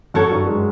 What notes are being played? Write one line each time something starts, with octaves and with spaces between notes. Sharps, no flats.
F#2 F#3 F#4 A4 C#5
G2 G3
G#3